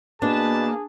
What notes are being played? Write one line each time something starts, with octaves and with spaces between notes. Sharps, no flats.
B2 A#3 D4 G#4 B4 A5